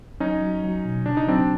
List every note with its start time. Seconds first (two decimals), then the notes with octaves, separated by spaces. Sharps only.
0.20 F#3 C#4 D#4
0.41 F#3
0.64 F#3
0.85 B2
1.06 C#3 D4
1.17 D#4
1.27 F#3 C4 D4